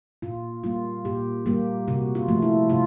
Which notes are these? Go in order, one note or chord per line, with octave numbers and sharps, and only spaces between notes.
A#2 F4
G3 A#3 F4
A#2 G4
G3 A#3 G4
C3 F#4
F4
F3 A3
E4
C3 F4